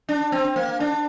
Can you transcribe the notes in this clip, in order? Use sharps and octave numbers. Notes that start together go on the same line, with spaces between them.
D4
C4
A#3
D4